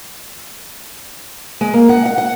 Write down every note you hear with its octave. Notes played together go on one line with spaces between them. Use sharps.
G#3
A#3
F#5
F#5
F#5